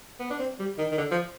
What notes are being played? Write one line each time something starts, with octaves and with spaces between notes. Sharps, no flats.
B3
D4
C4
G3
D#3
D#3
D3
F3